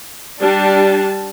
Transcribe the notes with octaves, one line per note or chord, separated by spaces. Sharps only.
G3 D4 A5